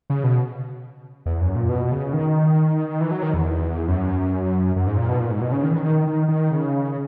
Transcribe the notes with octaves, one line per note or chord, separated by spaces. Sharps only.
C#3
B2
E2
F#2
A#2
B2
C#3
D#3
E3
F#3
D#3
E2
F#2
F#2
G#2
A#2
B2
A#2
G#2
B2
C#3
D#3
E3
D#3
D#3
D#3
C#3